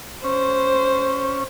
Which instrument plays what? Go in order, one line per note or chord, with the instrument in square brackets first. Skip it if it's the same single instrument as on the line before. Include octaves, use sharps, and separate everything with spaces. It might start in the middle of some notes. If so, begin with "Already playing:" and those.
[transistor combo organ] C#4 [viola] C5